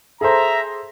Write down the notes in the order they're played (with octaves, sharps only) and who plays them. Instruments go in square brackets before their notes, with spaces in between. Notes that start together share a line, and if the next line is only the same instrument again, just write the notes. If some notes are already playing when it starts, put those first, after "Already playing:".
[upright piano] G#4 A4 C5 [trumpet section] E5 A#5